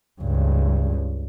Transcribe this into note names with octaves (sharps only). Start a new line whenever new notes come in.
C#2 G2